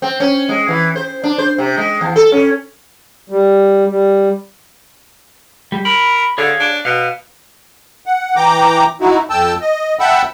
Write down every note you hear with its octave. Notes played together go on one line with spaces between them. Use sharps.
C4
C#4
G#3
E3
C5
D4
C5
C3
G#3
E2
A4
C#4
G3
G3
G3
A#4 B5
D3 G#4 C#5 F5
D4
B2 F5
F#5
E3 G5 A#5 D6
D#4 E4 F#4
F2 G5 A5 E6
D#5
E5 F#5 G5 A5 B5 E6